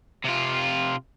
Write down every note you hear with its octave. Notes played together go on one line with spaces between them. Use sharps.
C3 F4